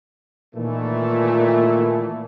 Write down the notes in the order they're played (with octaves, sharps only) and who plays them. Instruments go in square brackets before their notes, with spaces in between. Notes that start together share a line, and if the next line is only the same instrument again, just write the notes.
[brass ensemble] A#2 D#3 E3 A3